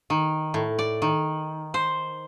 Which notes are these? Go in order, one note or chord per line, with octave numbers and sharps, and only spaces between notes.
D#3
A2
D5
D#3
C5